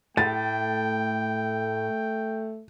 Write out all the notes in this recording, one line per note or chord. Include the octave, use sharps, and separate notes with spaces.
A2 A3 G5 A6